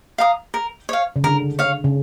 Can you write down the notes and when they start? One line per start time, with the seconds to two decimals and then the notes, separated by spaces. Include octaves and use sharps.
0.18 F5 A#5 D#6
0.54 A#4
0.89 C#5 F5
1.16 C#3
1.24 D3 A#4
1.59 C#5 F5
1.84 C#3